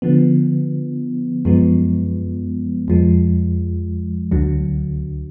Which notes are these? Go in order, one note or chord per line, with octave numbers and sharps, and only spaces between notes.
D3 F3 B3
F#2 F3 G#3 B3
F2 F3 G#3
D2 D3 F#3